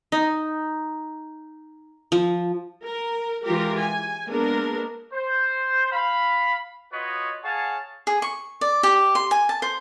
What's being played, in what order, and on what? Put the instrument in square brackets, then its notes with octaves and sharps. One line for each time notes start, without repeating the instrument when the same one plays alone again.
[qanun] D#4
F3
[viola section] A#4
E3 G#3 F4 G4 A#4
G#5
G#3 A#3 B3 D4 A#4
[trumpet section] C5
F5 B5
F4 F#4 B4 C#5 D#5
G#4 C#5 F5 F#5 G#5 A5
[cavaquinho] G#4
C#6
D5
G4
C6
G#5
A5
C5